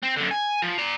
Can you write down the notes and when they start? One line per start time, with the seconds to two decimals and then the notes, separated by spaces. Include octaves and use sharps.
0.03 C4
0.16 F#2 D3
0.31 G#5
0.62 F3
0.78 D5 A#5